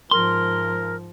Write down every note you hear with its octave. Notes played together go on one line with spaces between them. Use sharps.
G#2 F3 A#4 C6